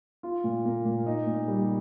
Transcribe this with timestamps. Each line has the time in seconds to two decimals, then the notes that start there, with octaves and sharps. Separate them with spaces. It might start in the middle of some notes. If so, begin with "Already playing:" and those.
0.23 F4
0.44 A#2
0.65 A#3
0.85 A#2
1.06 D#4
1.27 A#2
1.48 G3